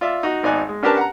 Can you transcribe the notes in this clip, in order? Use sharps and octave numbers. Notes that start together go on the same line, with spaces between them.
F4 D5 E5
D#4 F#4
G#1 D#4 D5 G#5 F#6
G#3
C#4 D4 G4 A#4 B4 A5
F#5 A#5